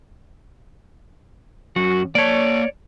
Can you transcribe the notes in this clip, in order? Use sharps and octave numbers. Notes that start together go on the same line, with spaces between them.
F#2 F#4
A#3 C#5 D5 A5